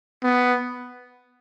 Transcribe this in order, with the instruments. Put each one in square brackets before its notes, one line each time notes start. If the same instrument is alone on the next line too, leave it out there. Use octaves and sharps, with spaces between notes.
[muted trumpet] B3